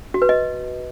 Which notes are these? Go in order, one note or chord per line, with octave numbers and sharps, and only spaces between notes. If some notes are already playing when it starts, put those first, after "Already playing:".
F#4
B4
D#5